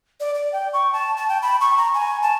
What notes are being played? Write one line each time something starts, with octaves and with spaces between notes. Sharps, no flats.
D5
D5
G5
C#6
A5
A5
G5
B5
C#6
A#5
G#5
A5